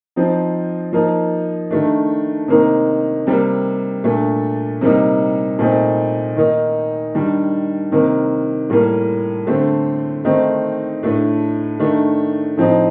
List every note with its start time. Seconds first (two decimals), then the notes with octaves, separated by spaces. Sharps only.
0.16 F3 C4 D#4
0.93 F3 A#3 D#4
1.71 D#3 A3 D4
2.48 C3 D#3 A#3 D#4
3.27 C3 G3 A#3
4.04 A#2 A3 D4
4.81 C3 G3 A#3 D#4
5.59 A#2 A3 C4 D#4
6.36 D#3 A#3 D#4
7.15 D#3 G3 D4
7.92 C3 D#3 A#3
8.70 A2 G3 A#3
9.47 D3 A3 C4
10.25 D#3 A3 C4 D#4
11.03 A2 A3 D4
11.79 D#3 A3 D4
12.57 A2 F3 C4 D#4